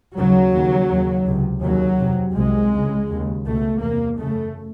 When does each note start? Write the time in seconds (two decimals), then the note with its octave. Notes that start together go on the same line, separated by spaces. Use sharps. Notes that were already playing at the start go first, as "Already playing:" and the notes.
0.17 D#2 C#3 F#3
0.54 D#2 C#3
0.90 D#2 C#3
1.27 C#2 C3
1.63 D#2 C#3 F#3
1.99 F2 C3
2.36 C2 C3 G#3
2.72 C#2 C#3
3.09 D#2 C#3
3.45 C#2 B2 A3
3.81 E2 C3 A#3
4.18 F#2 C#3 A3